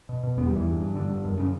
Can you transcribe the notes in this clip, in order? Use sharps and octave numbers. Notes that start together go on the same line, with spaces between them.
B2
B2
E2 B3
G3
E2 E3
G2
G2
G2 D3
G2
F#2
C#3